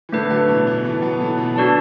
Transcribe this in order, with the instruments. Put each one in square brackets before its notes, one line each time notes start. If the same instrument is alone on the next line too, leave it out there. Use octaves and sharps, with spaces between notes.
[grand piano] E3
[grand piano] A2 D3 [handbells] A3 D4 B4
[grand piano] D3 F#3
B2 E3
B2
E3 A3
F#3 B3
E3 A3
B2 E3
[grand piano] D3 F#3 [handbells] D4 F#4 D5 A5